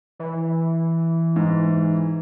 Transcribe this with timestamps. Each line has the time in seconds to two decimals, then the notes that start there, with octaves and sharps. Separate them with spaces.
0.19 E3
1.36 G#2